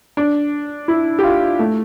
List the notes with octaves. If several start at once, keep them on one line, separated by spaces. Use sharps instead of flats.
D4
E4
G4
F4
A3